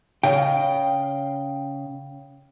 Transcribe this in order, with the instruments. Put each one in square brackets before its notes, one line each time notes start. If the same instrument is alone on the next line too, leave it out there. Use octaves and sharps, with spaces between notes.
[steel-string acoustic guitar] C#3 D#5 [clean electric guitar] F5 G5